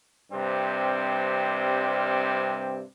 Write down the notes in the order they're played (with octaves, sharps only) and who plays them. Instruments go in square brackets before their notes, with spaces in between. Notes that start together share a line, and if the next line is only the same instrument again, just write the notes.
[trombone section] G2 C3 G3 C4